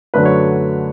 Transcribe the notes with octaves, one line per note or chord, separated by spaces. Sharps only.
F#2 D3 F#3 A3 D4 B4
C#5